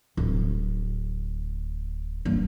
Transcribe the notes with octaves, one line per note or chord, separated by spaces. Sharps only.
D1
G2 A#3